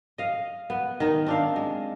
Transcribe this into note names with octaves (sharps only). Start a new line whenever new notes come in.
D#5 F5
B3
D#3 D#4
C4 D4 F5
G#3